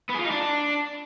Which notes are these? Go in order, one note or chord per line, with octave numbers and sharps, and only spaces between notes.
B3
G#4
F4
D#4
D4